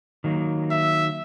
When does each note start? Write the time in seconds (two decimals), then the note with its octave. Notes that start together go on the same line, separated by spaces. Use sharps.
0.24 D#3 F#3 A#3
0.71 E5